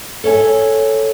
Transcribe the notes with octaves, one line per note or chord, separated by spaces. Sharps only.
A4 C#5 E5 G#5